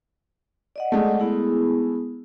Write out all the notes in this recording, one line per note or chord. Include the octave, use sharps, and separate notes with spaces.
D5 D#5 F#5
G#3 A3
B3 E4 G#4